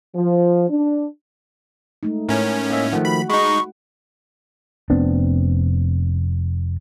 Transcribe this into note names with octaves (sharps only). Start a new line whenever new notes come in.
F3
D4
G#3 A3 D#4
A2 C#4 A#4
A#3 D#5 E5
D#3 F3 A3 F#5
F#4 B5
G#3 D#4 B5 C#6
F1 B3 C4 D4